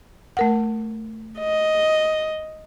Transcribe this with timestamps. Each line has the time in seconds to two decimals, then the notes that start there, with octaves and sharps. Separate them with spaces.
0.37 A3 A#4 F#5
1.39 D#5